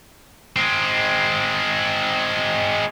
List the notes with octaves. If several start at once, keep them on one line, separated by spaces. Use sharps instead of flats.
G#3 C4